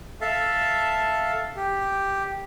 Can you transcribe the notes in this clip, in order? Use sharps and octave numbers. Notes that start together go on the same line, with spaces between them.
A4 E5 F5 A5
G4